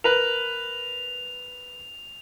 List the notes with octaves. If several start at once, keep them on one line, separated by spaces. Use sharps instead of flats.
A#4 B4 F7